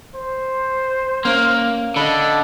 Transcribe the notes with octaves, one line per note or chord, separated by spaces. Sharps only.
C5
A#3 C#4 F5
D3 D4 D#5 B5